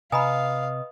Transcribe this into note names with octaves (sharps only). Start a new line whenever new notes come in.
C3 B4 D#5 F5 G#5 A#5 B5 D#6